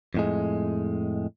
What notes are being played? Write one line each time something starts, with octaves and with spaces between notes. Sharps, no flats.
F2 A2 G#3